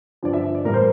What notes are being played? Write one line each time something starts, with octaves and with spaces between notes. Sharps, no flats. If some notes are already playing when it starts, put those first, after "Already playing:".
G2 D3 F3 D5
E5
D5
A2 E3 G3 A#4
C5